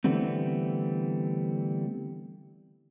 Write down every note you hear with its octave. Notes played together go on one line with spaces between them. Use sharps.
D3 E3 G3 A3 B3 C4